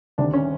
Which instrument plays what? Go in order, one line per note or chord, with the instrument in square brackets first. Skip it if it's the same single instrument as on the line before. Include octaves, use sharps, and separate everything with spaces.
[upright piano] D2 C3 D#3 D4
C#4